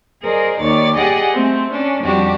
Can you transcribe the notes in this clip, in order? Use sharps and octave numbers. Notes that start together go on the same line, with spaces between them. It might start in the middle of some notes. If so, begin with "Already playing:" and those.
G#4 A#4 C5 D5 D#5
D#2 D#3 C#5 D5 A6
G4 G#4 D5 D#5 F#5 G#5
A3 C4
C#4 D4
F2 G3 D4 F#4 G4